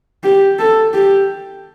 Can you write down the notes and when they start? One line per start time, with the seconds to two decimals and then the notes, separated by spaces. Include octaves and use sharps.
0.24 G4
0.59 A4
0.94 G4